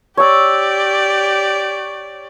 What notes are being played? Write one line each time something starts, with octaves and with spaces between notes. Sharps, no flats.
G4 C#5 D5 E6